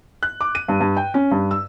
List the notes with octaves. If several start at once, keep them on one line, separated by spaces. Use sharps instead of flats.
F#6
D6
D#7
G2
G2
G5
C#4
G2
E6